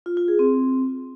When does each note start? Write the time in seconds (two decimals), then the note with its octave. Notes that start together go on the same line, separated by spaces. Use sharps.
0.06 F4
0.17 F4
0.28 G#4
0.39 C4